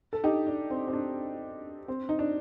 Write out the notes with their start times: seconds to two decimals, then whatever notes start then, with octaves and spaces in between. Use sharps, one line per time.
0.13 A4
0.24 D#4 G4
0.47 D4
0.70 C4
0.88 C4
0.93 D4
1.88 C4
2.09 D#4
2.19 D4